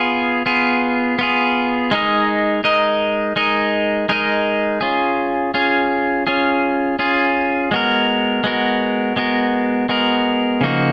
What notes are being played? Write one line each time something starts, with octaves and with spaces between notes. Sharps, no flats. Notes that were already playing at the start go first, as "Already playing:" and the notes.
Already playing: B3 F4 G#4
B3 F4 G#4
B3 F4 G#4
G#3 D#4 A#4 D#5
G#3 D#4 A#4 D#5
G#3 D#4 A#4 D#5
G#3 D#4 A#4 D#5
C#4 F4 G#4
C#4 F4 G#4
C#4 F4 G#4
C#4 F4 G#4
G#3 B3 F#4 A#4
G#3 B3 F#4 A#4
G#3 B3 F#4 A#4
G#3 B3 F#4 A#4
C#3 F3 A#3 D#4 F#4